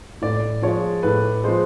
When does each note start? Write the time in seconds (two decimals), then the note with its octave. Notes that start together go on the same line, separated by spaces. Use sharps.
0.21 A2 D5
0.62 F3 G#3 C#5
1.03 A2 B4
1.44 F3 G#3 C5